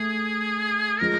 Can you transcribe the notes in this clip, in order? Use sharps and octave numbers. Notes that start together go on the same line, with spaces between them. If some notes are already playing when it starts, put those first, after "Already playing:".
Already playing: A3 G#4
F3 G#3 A#4